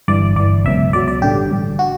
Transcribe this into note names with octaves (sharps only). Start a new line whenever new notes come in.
G1 G2 E3 D5
G1 G2 E3 D5
C#2 B2 F#3 E5
C#2 B2 F#3 D5
D5
A1 G2 D3 G4
A1 G2 D3
F#4